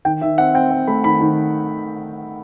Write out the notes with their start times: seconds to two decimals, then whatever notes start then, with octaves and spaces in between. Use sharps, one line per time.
0.05 D#3 G5
0.21 D#3 E5
0.38 C4 F#5
0.54 C4 G5
0.71 C4
0.87 A3 B5
1.04 D#3 B5
1.21 D#3